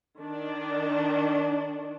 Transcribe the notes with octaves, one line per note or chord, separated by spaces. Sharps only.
D#3 D4